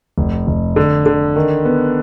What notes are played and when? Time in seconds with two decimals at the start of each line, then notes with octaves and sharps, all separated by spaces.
0.18 F1
0.47 F1
0.76 D3
1.06 D3
1.36 D#3
1.65 B3